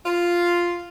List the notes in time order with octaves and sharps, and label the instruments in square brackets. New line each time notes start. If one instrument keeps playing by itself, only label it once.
[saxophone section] F4